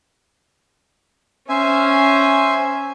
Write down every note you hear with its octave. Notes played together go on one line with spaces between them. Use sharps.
C#4 C5 E5 G#5